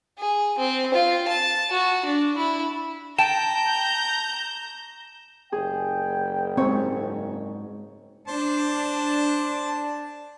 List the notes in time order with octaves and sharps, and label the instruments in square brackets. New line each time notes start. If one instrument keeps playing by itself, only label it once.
[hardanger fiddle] G#4
C4
F4
A5
F#4
D4
E4
[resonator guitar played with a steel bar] G5 [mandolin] A5 [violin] A#5 G6 [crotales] E7
[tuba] F#1 [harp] G#4 [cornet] G5
[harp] G#2 C#5 [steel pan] C4
[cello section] D4 [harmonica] C5 A5